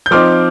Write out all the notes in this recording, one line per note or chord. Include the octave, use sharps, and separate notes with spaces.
G6
F3 C4 D#4 D6 F6